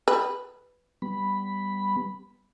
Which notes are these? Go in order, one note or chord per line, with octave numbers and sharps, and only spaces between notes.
B4
G3 B3 B5